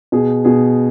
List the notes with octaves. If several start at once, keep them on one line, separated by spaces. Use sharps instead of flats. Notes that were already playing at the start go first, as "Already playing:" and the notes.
B2 G#4
B2 G#4